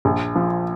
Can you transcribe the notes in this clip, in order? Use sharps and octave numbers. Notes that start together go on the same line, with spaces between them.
A#1
F3